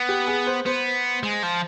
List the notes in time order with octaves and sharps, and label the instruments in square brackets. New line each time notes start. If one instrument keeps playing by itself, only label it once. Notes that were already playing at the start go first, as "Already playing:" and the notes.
Already playing: [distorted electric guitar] B3
[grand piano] G4
G#4
C5
[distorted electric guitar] B3 [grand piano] C5
[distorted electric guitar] G#3
F3